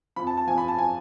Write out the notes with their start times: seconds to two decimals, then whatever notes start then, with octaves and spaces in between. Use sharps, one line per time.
0.16 F2 F3 B5
0.27 A5
0.37 A5
0.47 F3 G#5
0.50 F2
0.58 B5
0.68 A5
0.78 F3 G#5